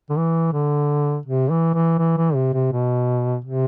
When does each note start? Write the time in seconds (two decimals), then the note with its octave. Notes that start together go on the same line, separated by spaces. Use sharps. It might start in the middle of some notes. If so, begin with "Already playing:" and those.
0.09 D3
0.17 E3
0.53 D3
1.26 C3
1.50 E3
1.74 E3
1.99 E3
2.17 E3
2.35 C3
2.54 C3
2.72 B2
3.45 C3